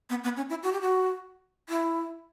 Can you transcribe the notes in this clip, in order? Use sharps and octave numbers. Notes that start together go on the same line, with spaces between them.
B3
B3
C#4
E4
F#4
G4
F#4
E4